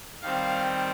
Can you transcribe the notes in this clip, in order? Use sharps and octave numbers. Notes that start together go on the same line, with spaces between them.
D#3 G3 C4 F5